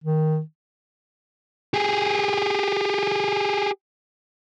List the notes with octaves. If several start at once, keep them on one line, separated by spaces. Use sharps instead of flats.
D#3
G4 G#4